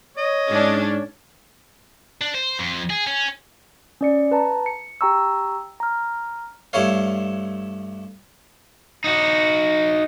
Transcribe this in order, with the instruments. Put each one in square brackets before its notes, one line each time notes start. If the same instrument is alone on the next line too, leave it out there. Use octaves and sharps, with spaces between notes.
[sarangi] C#5 [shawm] D#5
[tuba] G#2 [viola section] C#4 D4
[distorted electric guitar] D4
C5
F2
G#4
C#4
[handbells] C#4 D5 C#7
B4 A5 A#5
C#7
G4 G5 A#5 C#6 E6
A#5 F6
[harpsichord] G2 A3 E4 C#5 F5
[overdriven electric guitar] D#4 F#4